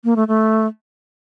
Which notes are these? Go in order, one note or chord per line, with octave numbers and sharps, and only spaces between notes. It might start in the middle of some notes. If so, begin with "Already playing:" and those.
A#3
A3
A3